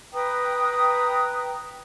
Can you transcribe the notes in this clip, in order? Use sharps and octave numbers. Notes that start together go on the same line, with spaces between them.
B4 G5 A#5 D#6